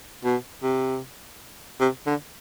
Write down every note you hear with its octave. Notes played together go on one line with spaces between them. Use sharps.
B2
C3
C3
D3